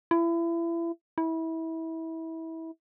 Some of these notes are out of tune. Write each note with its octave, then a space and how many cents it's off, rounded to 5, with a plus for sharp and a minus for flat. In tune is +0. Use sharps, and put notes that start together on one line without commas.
E4 +30
E4 -25